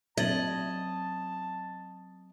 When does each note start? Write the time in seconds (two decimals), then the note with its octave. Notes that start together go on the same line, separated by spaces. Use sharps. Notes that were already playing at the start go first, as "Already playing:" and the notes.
0.17 F#3 C4 D#5 A5 G#6 A6 F#7